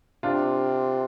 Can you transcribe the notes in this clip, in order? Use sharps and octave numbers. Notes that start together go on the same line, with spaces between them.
C3 D4 F4